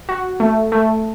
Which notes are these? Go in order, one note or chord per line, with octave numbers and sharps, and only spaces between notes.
F#4
A3
A3